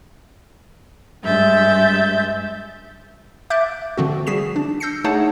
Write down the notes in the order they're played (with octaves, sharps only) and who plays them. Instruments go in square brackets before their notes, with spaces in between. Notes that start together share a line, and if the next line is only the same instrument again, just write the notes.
[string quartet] G2 G#3 E5 G6 A6
[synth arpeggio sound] E5 D6 F#6 G6 A6 D7
D3 F3 C4 F#4
G3 F#4 G#4 B6 C7 E7
D4
E6 G6 A#6 C7 C#7
A3 D#4 G#4 C#5 F#5 A5